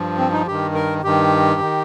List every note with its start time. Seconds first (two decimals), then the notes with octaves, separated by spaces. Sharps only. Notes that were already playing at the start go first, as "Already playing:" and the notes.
Already playing: G2 F3
0.18 C4
0.32 D#4
0.47 G2 D#3 G4
0.74 A#4
1.03 G2 D#3 G4
1.61 D#3